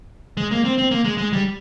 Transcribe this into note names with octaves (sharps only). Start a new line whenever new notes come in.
G#3
A#3
C4
C4
A#3
G#3
G#3
G3